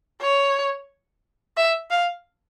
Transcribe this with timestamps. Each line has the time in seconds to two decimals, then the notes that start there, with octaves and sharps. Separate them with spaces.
0.22 C#5
1.57 E5
1.91 F5